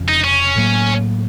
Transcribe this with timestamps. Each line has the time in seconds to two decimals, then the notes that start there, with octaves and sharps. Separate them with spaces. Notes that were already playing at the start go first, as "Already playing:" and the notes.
Already playing: F1 F2 C#3 F3
0.08 D#4
0.24 C#4
0.56 A2 F#3 A#3